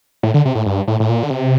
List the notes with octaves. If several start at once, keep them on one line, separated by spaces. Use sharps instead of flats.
A2
D3
C3
A2
G2
A2
A2
A#2
D3
C3